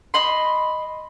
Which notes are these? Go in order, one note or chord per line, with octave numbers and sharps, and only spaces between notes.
D#5 B5 C6